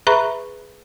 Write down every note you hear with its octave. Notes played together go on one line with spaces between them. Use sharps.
G#4 B4 E5 A#5 B5 C#6